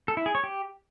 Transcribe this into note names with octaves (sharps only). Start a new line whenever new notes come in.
A4
E4
G#4
C#5
G4